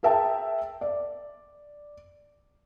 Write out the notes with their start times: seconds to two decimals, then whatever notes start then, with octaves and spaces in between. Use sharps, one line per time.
0.03 G#4 A#4 E5 G5 A5
0.81 D5